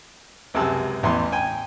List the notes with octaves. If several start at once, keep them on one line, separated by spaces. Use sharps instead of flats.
C#2 F#2 C3 G#3 A5 E6
A1 E2 C6
G5 G#5